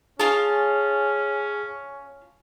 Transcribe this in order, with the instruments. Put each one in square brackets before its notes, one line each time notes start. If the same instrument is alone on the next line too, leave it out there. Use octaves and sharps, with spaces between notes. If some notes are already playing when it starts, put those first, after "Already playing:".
[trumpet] C#4 [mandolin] F4 A5 [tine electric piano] G#4